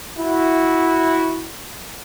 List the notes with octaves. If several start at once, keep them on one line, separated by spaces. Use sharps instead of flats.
E4 F#4